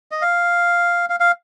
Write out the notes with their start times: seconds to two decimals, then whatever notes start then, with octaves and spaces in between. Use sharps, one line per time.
0.11 D#5
0.22 F5
1.10 F5
1.20 F5